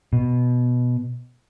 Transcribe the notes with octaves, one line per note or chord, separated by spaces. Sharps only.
B2